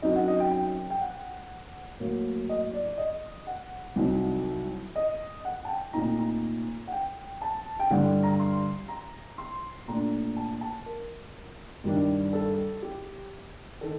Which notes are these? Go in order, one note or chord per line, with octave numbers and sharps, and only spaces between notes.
F#2 F#3 C4 D#4 D#5
F#5
D#5
G5
G5
G5
F#5
A2 F#3 A#3
D#5
D5
D5
D#5
F#5
C2 C3 F#3 C4 D#4
D#5
F#5
A5
G5
A#2 A3 C4 D#4 A#5
A#5
F#5
G5
A5
G5
G2 D3 G3 F#5
A#5
C6
A#5
C6
A#2 A3 D4 A#5
A5
A5
A#4
G2 D#3 G3 D4
A4
G4
D#3 A4